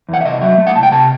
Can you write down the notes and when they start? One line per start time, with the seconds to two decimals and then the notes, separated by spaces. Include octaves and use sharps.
0.09 E2 F#5
0.21 E5
0.25 C2 D#5
0.42 F#3 E5
0.58 A3
0.67 F#5
0.75 C2 A5
0.83 G5
0.92 C3 A5